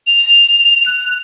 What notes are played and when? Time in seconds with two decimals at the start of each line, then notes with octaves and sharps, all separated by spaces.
0.07 F7
0.86 F#6